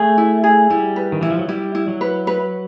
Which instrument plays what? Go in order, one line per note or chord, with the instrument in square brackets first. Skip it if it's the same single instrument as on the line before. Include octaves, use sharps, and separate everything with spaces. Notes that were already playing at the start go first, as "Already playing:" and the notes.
Already playing: [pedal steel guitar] A3 [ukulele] G#4
[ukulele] E4
G#4
[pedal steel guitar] G3 [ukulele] E4
[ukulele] B4
[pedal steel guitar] D#3
[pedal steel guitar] E3 [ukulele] E4
[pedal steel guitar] F3
F#3
[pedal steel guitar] G3 [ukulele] E4
[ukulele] E4
[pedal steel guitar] F#3
[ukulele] B4
B4